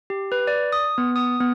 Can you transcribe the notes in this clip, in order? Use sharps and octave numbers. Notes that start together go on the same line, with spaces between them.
G4
B4
D5
D#6
B3
D#6
B3